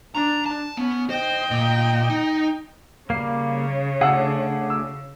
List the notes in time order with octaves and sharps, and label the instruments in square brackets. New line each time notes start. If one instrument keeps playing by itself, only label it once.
[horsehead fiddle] D4 [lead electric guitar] A#5
[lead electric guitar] A5
[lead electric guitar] B3 [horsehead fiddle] C#4
[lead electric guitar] C5 [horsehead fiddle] D#5 G5
[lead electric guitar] A#2
D#4
[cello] C#3 [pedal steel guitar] G3 A#3 [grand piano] C7
[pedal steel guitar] A3 D4 G#4 [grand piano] F#5 E6
[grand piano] E6